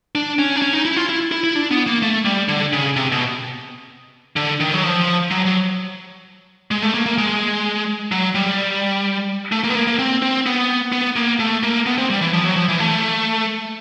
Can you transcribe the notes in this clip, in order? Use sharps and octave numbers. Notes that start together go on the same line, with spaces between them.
D4
C#4
D4
C#4
D#4
E4
F4
E4
E4
E4
D4
B3
A#3
A3
G3
D3
C#3
C3
B2
D3
D#3
F#3
F3
F#3
F#3
G#3
A3
A#3
A#3
G#3
F#3
G3
A3
A#3
B3
A#3
A#3
C4
C4
B3
B3
A#3
A3
A#3
B3
C4
G3
E3
F3
F#3
F3
E3
A3